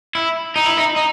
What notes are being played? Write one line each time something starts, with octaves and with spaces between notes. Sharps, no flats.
E4
D#4
E4
D#4
D#4